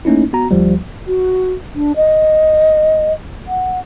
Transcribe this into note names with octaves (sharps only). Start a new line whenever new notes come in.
A3 A#3 C#4 D#4 E4
B3 F#4 A#5
D2 F3 G3
F#4
D4
D#5
F#5